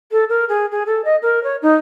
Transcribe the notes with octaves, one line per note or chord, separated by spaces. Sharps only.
A4
A#4
G#4
G#4
A4
D#5
A#4
C#5
D#4